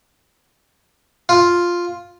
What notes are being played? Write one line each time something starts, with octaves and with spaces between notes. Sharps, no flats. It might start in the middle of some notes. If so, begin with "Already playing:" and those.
F4